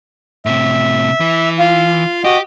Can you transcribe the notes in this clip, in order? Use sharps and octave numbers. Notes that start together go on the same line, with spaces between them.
A2 C3 E5
E3
F4 F5
F#4 G4 D#5